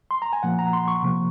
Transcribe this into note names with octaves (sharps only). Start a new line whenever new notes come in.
C6
A#5
G#5
A#2 F3 A#3 F#5
A#5
C6
C#6
C3 F3 A#3